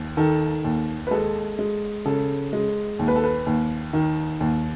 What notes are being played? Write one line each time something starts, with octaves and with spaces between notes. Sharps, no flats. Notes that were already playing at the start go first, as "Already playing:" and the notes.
Already playing: D#2
D#3 A4
D#2
B4
G#3 A4
G#3
C#3 A4
G#3
D#2
B4
A4
B4
D#2
D#3
D#2